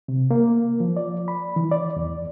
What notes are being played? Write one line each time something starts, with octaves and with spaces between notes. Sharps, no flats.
C3
A#3
F3
D5
B5
E3
D5
E2